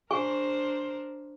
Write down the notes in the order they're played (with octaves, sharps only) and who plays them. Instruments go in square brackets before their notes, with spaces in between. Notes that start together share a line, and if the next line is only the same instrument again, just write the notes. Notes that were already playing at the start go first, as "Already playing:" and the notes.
[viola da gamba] D4 A#4 C5 [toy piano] G#4 G#5 C#6